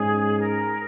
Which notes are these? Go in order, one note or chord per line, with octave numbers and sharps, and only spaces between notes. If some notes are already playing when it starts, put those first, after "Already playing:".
Already playing: G#2 G#3 C#4 G#4
A#4